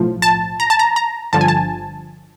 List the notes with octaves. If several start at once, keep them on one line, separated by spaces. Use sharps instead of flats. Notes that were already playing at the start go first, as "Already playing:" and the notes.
Already playing: B1 A2 F3
A5
A#5
A5
A#5
A#5
G1 G2 D3 F3 A5
G#5
A5